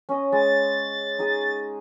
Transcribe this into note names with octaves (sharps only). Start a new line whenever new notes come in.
C#4 D#5
G#3 A6
D#4 G#4